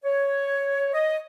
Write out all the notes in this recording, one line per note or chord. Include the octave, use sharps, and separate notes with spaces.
C#5
D#5